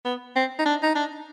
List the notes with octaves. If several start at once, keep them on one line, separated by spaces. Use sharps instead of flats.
B3
C4
D#4
D4
D#4
D4